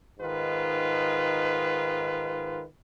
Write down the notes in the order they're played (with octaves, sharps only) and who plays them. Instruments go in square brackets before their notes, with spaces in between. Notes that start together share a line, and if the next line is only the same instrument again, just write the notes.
[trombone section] G#2 D#3 F4 B4